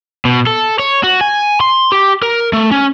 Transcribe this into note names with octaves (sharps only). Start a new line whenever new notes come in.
B2
A4
C#5
F#4
G#5
C6
G4
A#4
A3
C#4